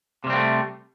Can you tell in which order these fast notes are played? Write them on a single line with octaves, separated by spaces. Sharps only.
C3 G3 C4 A#3 A3